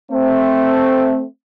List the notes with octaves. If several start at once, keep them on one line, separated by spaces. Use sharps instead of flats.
A3 C4